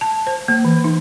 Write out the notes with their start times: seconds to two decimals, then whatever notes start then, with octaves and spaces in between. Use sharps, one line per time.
0.01 A5
0.27 C5
0.48 A#3
0.65 E3
0.84 D#4